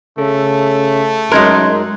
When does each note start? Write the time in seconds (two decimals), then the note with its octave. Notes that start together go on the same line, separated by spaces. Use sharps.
0.18 C#3 A3 A4
1.32 F#2 G#3 D#4 A#4 C6 F#6 G#6